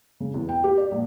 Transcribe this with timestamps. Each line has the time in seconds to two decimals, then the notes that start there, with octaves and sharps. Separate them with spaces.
0.20 C#3
0.34 E2
0.49 G5
0.64 G4
0.78 D5
0.92 A#1